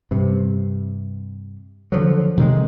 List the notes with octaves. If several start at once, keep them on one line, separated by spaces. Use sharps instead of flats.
G2 C3
D3 F3 F#3
C3 D#3 G3 G#3